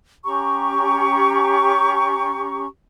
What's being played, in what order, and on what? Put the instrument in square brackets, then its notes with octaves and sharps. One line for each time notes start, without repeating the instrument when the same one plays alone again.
[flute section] C#4 G4 A#5 C#6